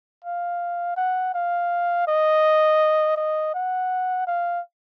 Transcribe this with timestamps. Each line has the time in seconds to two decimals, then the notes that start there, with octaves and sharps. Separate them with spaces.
0.24 F5
0.97 F#5
1.34 F5
2.08 D#5
3.17 D#5
3.54 F#5
4.27 F5